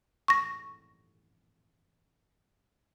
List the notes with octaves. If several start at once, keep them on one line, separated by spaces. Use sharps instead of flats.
C#6 A#6